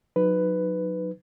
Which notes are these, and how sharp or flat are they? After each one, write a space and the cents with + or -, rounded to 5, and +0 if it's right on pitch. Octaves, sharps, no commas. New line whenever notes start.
F#3 -20 D#4 -5 B4 +10